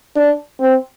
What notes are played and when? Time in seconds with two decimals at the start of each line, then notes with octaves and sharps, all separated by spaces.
0.16 D4
0.60 C4